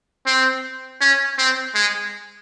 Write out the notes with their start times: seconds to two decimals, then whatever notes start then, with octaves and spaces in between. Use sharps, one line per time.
0.26 C4
1.01 C#4
1.38 C4
1.75 G#3